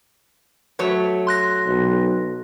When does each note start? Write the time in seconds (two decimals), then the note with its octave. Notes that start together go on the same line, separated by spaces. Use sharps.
0.79 F#3 A3 C#5
1.27 C6 F#6 A#6
1.67 B1